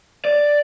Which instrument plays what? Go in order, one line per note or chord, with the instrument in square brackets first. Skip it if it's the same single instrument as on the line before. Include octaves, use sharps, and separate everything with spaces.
[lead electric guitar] D5